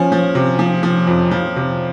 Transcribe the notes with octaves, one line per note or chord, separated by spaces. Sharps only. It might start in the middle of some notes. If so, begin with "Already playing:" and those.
Already playing: F3 C#4
F3
C3
F3
F3
F2
F3
C3